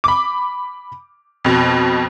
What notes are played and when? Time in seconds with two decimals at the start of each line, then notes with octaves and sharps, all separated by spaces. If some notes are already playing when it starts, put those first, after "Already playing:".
0.04 B5 D6
1.45 F2 B2